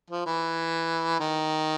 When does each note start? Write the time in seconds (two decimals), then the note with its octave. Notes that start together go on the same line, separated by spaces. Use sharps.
0.10 F3
0.26 E3
1.20 D#3